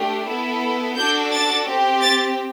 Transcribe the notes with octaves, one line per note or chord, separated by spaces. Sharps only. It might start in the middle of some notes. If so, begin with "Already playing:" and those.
Already playing: A3 D4 G4
B3 E4 A4
D4 F#4 A4 G6
A6
C4 G4
A6